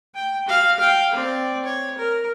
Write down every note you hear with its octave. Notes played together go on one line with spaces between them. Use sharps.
G5
F#4 F5
F5 G5
C4 D5
C#5
A#4